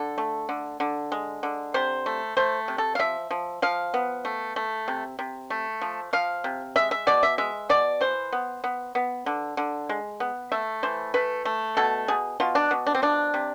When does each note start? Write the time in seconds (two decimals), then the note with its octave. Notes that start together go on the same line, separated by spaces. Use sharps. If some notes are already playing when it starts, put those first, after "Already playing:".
Already playing: D3 A4
0.18 A3
0.49 D3
0.80 D3
1.12 G#3
1.43 D3
1.74 C3 C5
2.06 A3
2.37 A3 C5
2.68 C3
2.78 A4
2.95 F5
2.99 F3 E5
3.31 F3
3.62 F3 F5
3.94 B3
4.25 A3
4.56 A3
4.88 C3
5.19 C3
5.50 A3
5.81 F3
6.13 F3 F5
6.44 C3
6.76 G#3 E5
6.91 E5
7.07 B2 D5
7.23 E5
7.38 G#3 E5
7.69 B2 D5
8.01 E3 C5
8.32 B3
8.64 B3
8.95 B3
9.26 D3
9.57 D3
9.89 G#3
10.20 B3
10.52 A3 E5
10.83 E3 C5
11.14 A3 B4
11.45 A3
11.77 B2 A4
12.08 B2 G#4
12.40 B2 F4
12.55 D4
12.71 B2
12.86 D4
12.95 C4
13.02 F3 D4
13.34 C3